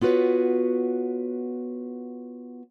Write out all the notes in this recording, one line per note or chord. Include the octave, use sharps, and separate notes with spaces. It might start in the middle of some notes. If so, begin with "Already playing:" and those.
B3 F4 F#4 B4 C#5